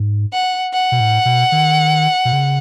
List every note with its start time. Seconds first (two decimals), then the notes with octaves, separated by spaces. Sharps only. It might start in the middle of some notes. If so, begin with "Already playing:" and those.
Already playing: G#2
0.33 F#5
0.73 F#5
0.92 B2
1.00 A2
1.25 B2
1.52 D#3
2.25 B2
2.32 C#3